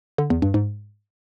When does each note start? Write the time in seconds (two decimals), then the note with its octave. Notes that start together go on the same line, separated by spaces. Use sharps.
0.18 D3
0.30 E2
0.42 G2
0.54 G#2